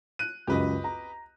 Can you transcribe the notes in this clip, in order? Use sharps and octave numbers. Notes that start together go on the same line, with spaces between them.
F#6 D#7
C#2 F#2 G4 B4 D#5
A#5